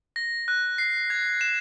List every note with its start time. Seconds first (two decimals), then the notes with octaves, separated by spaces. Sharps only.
0.16 A#6
0.48 F#6
0.78 C7
1.10 G#6
1.41 E7